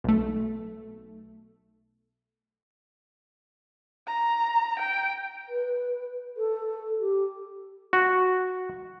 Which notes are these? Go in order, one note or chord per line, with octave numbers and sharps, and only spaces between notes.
B1 A3
A#5
G5
B4
A4
G4
F#4